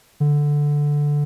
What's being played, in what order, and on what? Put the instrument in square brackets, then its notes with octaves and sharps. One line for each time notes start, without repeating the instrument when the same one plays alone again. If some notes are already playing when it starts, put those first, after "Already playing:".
[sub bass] D3